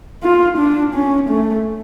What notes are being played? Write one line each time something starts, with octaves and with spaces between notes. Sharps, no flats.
F4
D4
C#4
A3